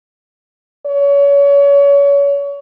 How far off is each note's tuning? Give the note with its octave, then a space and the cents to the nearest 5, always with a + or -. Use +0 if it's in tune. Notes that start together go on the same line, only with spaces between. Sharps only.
C#5 +30